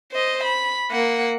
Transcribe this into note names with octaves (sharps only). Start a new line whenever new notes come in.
C5 D#5
B5
A#3 F#5